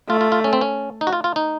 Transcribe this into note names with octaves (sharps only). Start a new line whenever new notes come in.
A3 F4
F4
F4
C#4
C4
C#4
D#4
F#4
F4
F4
D#4